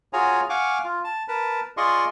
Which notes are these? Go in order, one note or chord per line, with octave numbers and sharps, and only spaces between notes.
F4 F#4 G#4 C#5 G#5 A#5
F5 F#5 G#5 C#6 D6
F4
A5
A#4 B4 A5
F4 G#4 D5 D#5 C6 C#6